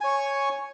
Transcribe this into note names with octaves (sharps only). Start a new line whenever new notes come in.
C#5 G#5 C#6